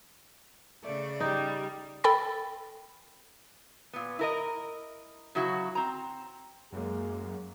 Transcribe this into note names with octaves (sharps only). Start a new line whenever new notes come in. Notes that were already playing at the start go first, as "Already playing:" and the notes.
C#3 A3 D5
G3 D#4
A4 G5 B5 A6
A#2 B3
E4 A#4 D#5
C#3 F#3 E4 F#4
C4 A#5
F#2 G#3 A#3